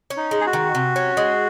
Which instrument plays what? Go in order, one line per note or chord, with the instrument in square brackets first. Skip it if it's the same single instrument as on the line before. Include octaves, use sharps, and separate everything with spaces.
[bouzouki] C#4
[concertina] D#4
[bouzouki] G#3
[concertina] G#4
F#4
[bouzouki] D#3
C3
C#4
G#3